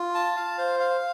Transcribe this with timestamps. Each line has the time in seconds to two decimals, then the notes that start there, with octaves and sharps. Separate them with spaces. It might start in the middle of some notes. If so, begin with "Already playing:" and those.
Already playing: F4
0.15 A5
0.36 F5
0.58 C5
0.80 F5